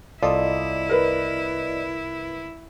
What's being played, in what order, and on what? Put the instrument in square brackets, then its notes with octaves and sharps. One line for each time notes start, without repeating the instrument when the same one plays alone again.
[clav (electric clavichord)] C2 F4 A4 [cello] E4 [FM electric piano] D5 D#5
[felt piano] A#4 B4